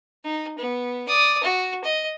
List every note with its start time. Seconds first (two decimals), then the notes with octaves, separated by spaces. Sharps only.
0.25 D#4
0.58 B3
1.08 D5 D#6
1.43 F#4
1.84 D#5